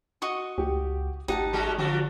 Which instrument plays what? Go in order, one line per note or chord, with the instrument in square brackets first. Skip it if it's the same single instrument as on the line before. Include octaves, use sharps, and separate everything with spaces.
[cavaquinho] F#4 D#5 C#6
[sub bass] C#2 [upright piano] G4
[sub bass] G#1 [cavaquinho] D#4 F#5 A5 [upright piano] G4
[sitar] G3 G#3 F#4
[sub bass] D3 [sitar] F3 G3 F#4